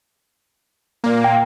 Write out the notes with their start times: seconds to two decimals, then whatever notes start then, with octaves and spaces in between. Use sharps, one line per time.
1.04 A#2 A#3
1.24 G5